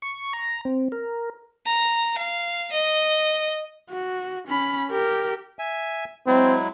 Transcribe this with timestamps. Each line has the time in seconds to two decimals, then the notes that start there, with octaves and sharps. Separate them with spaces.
0.02 C#6
0.33 A#5
0.65 C4
0.92 A#4
1.66 A#5
2.18 F5
2.73 D#5
3.90 F#4
4.48 C#4 B5
4.90 G4 A#4
5.59 E5 G#5
6.27 F#3 G#3 C4 E4